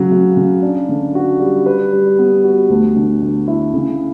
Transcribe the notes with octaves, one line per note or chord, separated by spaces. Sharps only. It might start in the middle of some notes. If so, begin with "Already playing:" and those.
Already playing: C#3 F#3
C#3
C#3
D4
D3
F#4
G3
B4
G3
B3
F#4
D2
D3
D3
E4
C#3